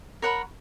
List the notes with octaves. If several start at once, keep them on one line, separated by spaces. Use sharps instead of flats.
A#4 C#5 F#5 B5